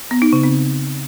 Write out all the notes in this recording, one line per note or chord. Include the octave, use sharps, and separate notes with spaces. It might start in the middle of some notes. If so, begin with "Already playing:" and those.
B3
D#4
C#3
C4